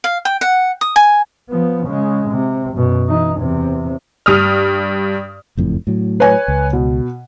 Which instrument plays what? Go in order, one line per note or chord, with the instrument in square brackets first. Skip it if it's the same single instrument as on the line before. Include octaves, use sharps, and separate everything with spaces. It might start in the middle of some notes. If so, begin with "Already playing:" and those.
[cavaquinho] F5
G5
F#5
D#6
G#5
[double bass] F3 B3
C#3 G#3
C3
F#2 B2
E3 D#4
E2 C3
[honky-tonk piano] G2 D#6 F6
[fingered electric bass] F#1 F2 A2
A2 F#3
[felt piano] B4 C#5 G#5
[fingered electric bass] C#2
[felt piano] B2